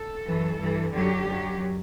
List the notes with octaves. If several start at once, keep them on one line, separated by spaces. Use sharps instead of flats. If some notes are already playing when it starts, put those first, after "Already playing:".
Already playing: A4
F#2 E3
G2 E3
F#2 D3 F#3 G4
F#2 F#3